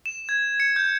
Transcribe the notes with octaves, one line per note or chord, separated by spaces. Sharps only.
E7
G#6
C#7
G6